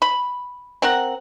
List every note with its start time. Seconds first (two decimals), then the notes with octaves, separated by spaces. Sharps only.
0.02 B5
0.82 C4 A#4 F#5